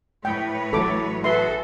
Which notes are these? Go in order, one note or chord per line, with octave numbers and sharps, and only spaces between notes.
A2 B4 C#5 G5
A1 F#3 A4 D6
F#4 G#4 A4 B4 E5 C6